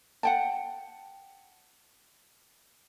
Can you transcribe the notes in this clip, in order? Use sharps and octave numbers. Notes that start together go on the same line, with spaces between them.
F#5 G5 A5